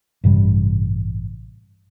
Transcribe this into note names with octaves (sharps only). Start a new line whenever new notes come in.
A1 G2 C3 G3